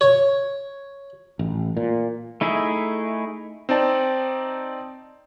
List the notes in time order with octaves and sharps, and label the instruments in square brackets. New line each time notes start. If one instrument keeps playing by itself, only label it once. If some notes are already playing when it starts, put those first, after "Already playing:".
[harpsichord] C#5
[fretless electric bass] A1
A#2
[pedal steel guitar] A3 D#4 E4 G#4 E5
[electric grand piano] C4 D#4 D5 A5